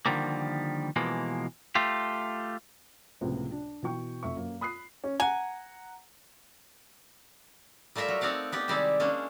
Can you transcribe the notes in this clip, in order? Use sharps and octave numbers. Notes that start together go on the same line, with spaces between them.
D3 D#3 F3 G3 A#3
B2 E3 F3 G#3 A#3
A3 F4 G4
C#2 A2 C3 F3 B3
D4
B2 E3 G5 C#6
F1 E5 C#6
F#2 A#3
B5 D#6 F#6 C7
C#4
F#5 G#5 A#5
G3 A3 F4 A#4 E5
F#3
C4 D#4 D5 F5 F#5
B3 G4 D5
C3 D#3 G3 G#3 E4 D5
G#3 A#3 C#4 D4